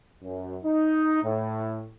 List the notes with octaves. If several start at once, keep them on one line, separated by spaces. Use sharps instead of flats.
F#2
D#4
A2